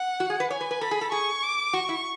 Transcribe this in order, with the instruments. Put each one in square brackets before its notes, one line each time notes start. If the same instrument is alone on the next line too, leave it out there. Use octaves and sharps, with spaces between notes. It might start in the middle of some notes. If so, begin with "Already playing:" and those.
Already playing: [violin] F#5
[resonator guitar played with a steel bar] F#4
G#4
B4
[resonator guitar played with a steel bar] C#5 [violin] G#5
[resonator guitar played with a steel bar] B4
B4
[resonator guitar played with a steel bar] A4 [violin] B5
[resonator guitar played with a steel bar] G#4
A4
[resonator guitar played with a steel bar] G#4 [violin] C#6
[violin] D6
[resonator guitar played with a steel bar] F#4 [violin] C#6
[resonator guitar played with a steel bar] E4